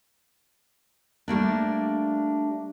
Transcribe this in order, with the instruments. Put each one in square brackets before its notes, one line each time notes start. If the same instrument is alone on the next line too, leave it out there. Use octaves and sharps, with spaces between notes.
[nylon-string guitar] G3 A3 A#3 D4